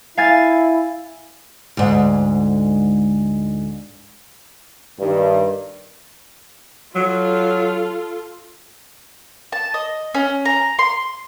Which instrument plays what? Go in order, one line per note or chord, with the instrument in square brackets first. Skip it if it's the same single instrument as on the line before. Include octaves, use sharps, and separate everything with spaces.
[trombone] E4 [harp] F5 G#5 A6
[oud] D2 G#2
[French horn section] G2 D#3
[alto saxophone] F#3 [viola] F4 A4
[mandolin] A5
D#5
C#4
A#5
C6